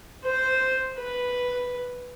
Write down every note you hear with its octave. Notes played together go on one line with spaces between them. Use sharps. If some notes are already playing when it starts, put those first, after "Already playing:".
C5
B4